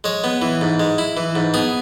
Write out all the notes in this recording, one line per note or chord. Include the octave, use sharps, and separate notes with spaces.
G#3 C#5
B3
E3
G#2
G#3
E4
E3
G#2
B3 G#4